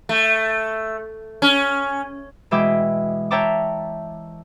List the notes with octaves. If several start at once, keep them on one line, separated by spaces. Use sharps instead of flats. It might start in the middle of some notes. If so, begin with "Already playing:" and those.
A3
C#4
B2 E3 G#3 E5 G5 D6
C#5 E5 G5 A5 A#5 D6